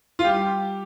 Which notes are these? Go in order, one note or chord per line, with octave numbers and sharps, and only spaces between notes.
F4
G3 G4